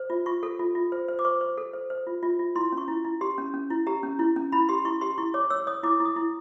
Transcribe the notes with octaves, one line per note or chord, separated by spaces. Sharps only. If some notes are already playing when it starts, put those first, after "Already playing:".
Already playing: C5
F4
F4 C#6
A4
F4
F4
C5
C5
D6
C5 C#6
C5
A4
C5
C5
F4
F4
F4
E4 C6
C#4
C#6
E4
E4
G4 C6
C#4
C#4
E4
G4 A#5
C#4
E4
C#4
E4 B5
G4 C6
E4 C#6
G4 C6
E4 C#6
C#5 D6
C#5 E6
C#5 D#6
E4 D6
E4
D#6
E4